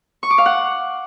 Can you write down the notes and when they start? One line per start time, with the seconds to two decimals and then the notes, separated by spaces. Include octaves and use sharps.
0.23 C#6
0.30 D6
0.38 F5
0.46 F#5